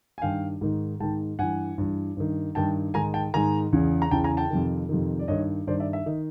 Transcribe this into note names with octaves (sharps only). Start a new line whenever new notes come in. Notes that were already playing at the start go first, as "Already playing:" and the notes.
G#5
G2 D#3 F5 G5
G#2 D#3
G#2 D#3 G5 A5
G2 E3 F#5 G#5
G2 E3
G2 D#3
G2 D#3 G5 A5
G#2 D#3 G#5 A#5
G5 A5
G#2 D#3 G#5 A#5
E2 C#3 E3
A#5
E2 C#3 E3 G5 A5
G#5 A#5
G5 A5
F2 C3 D#3
F2 C3 D#3
D5
G2 D#3 C#5 D#5
G2 D#3 C5 D5
D5 E5
E5
D#3 D#5